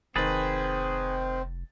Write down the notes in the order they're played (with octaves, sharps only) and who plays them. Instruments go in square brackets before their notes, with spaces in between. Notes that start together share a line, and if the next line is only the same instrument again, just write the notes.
[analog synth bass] F1 [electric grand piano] D#3 A6 [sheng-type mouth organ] C4 [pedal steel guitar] G#4 B4